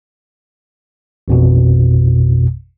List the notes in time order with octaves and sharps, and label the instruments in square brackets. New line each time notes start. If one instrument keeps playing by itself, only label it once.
[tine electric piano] A1 F2 B2